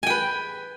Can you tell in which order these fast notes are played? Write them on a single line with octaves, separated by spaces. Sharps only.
G#5 G5 B4